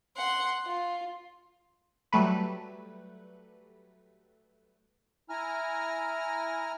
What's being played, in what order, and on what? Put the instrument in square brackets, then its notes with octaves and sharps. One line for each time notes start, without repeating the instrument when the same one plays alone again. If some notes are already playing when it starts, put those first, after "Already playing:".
[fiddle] F#5 C6
F4
[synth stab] F#3 G3 A3 B4
[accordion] E4 G#5 A#5 F6